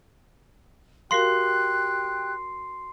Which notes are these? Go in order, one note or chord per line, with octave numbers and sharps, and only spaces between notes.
F#4 G4 A#4 F5 G5 C6 F#6 C7